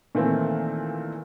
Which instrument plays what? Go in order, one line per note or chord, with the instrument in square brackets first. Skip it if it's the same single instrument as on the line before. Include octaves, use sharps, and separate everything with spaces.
[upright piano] A#2 D#3 E3 A3 A#3 C4